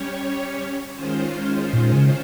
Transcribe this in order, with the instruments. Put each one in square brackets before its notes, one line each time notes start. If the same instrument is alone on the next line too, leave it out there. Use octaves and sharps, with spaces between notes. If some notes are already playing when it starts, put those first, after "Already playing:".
Already playing: [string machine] G3 C#4 G4 C#5
D#3 G#3 C#4 F4 C5
[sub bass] A#2
C#3